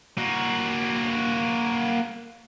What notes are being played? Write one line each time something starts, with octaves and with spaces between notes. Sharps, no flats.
A#3 F#4